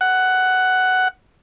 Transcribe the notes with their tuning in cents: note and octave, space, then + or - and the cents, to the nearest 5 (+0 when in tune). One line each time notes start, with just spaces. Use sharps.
F#5 +10